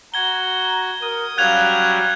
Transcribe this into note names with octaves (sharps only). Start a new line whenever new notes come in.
F#4 A#5 G#6 G7
A#4 D#6
F#3 G3 C#4 F5 F#6 G#6 F7